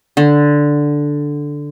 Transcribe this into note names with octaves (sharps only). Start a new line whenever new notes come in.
D3